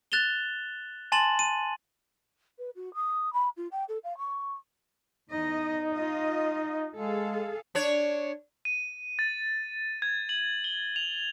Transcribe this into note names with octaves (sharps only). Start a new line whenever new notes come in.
F#6 A6 E7 F7 G7
G#5 A5 C6 A6 E7 F#7
D#7
B4
F#4
D#6
B5
F4
G5
A4
F5
C#6
E2 D#4 D#5
F4 D#5
G#3 G#4 A4 F5
D4 C#5
D#7
A6
G#6
F#7
G7
F7